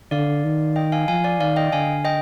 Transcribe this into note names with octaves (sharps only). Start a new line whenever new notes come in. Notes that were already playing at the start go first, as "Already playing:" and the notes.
D3 D5 F5
D#3
D#5 G5
F5 G#5
F3 F5 G#5
D5 F5
D#3 D5 F5
D#5 G5
D3 F5 G#5
D#5 G5